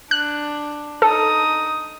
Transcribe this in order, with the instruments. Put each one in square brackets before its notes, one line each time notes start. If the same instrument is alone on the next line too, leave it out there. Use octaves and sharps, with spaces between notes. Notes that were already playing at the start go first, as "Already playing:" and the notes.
[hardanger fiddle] D4 [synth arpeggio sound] F#6
[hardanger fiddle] D#4 D#6 [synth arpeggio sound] A4